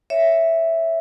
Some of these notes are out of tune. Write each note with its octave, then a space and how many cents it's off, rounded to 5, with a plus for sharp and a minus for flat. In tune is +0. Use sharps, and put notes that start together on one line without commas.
C#5 +0 E5 +0